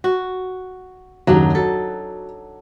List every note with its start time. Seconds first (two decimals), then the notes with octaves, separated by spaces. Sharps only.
0.04 F#4
1.27 F#1 D#2 D#3 F#3 D4 D#4
1.55 F#4 A4